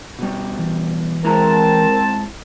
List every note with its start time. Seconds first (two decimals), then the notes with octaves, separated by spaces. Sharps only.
0.19 B2 G3
0.59 E3
1.25 G#3 C4 E4 A#4 A5 A#5